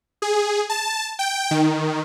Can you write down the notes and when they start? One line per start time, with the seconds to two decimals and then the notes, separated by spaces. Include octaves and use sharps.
0.22 G#4
0.70 A5
1.19 G5
1.51 D#3